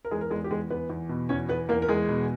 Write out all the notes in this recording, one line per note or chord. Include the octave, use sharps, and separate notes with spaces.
A#4
E2 G#3 G#4
A#4
E2 G#3 G#4
G4
E2 G#3 G#4
E2 B3 B4
E2
B2
E2 C#4 C#5
E2 B3 B4
E2 A#3 A#4
A#4
E2 G#3 G#4
B2